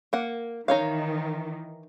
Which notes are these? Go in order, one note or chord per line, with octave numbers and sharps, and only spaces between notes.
A#3 F#5
D#3 E3 D#4 C#5 F5